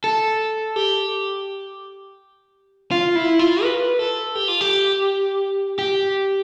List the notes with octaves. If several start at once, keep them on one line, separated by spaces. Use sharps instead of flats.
A4
G4
F4
E4
F4
B4
A4
G4
F4
G4
G4